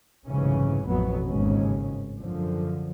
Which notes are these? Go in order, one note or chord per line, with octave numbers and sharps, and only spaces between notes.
F1 B1 G#2 C#3 E3 C#4
A1 F2 B2 F#3 B3
G#1 D#2 C#3 G#3 C#4
F#2 D3 F3